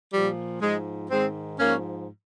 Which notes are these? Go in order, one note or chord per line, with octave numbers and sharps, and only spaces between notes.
A#2 F3 G3
G#2 F3 G#3
G#2 D#3 G#3 C4
G#2 F3 A#3 C#4